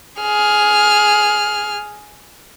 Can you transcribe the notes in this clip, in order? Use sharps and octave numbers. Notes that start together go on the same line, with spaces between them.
G#4 F6